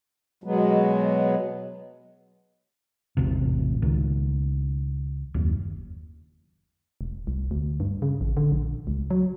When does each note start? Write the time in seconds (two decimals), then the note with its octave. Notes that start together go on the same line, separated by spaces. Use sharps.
0.44 B2 F#3 G#3 B3
3.17 A1 E2 C3
3.82 C#2 D#3
5.34 F#1 D#2
7.01 E1
7.27 C2
7.51 D2
7.80 G2
8.02 C#3
8.21 A1
8.37 D3
8.52 A#1
8.87 C#2
9.10 F#3